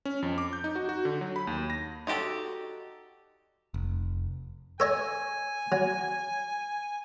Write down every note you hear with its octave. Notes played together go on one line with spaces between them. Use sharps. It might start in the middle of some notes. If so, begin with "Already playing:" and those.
C#4
F2
D6
G6
D#4
F#4
F#4
D3
F#3
B5
D#2
A#6
D#4 F#4 G4 A4 D5
F1
A4 C#5 D#5 G#5
F#3